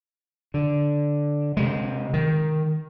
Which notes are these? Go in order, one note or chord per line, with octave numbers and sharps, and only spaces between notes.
D3
C3 G#3
D#3